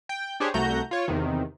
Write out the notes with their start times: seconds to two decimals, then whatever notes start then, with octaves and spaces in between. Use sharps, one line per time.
0.09 G5
0.40 D4 G4 G#4 C5 C#5
0.54 C2 A3 F#4 A#5 G6
0.91 F4 C#5
1.08 E2 C3 D#3